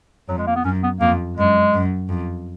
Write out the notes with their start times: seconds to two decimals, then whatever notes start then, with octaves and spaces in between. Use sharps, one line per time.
0.29 F2 F#3
0.38 G#3
0.47 A#3
0.56 B3
0.64 F#2 C#4
0.83 B3
1.01 F2 A#3
1.37 F#2 G#3
1.73 F#2
2.09 F2